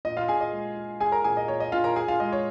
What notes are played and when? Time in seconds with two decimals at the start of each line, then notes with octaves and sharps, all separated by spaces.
0.05 A#2 D#5
0.17 F4 F5
0.28 A#2 G#4 G#5
0.40 D#5
0.52 G#3
0.77 F4
1.00 F4 G#4 G#5
1.12 A#4 A#5
1.24 A#2 G#4 G#5
1.37 D#5
1.48 A#2 C#5
1.60 D#5
1.72 A#2 F4 F5
1.84 A#4 A#5
1.96 F4 G#4 G#5
2.08 F4 F5
2.20 G#3 D#5
2.32 C#5